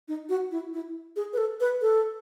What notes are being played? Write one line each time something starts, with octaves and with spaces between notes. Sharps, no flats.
D#4
F#4
E4
E4
G#4
B4
A4
B4
A4